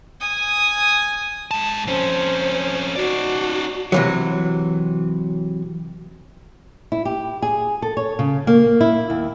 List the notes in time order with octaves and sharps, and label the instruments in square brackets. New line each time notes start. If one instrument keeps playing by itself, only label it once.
[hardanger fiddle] G#5 D#6
[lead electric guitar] G#2 A5
[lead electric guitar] F2 C#4 [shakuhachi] C5
[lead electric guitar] D#4 D5 [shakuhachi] F#4
[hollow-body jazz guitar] C3 E3 F#3
[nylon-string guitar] E4
G4
G#4
A4
C#5
C#3
A#3
E4
D#2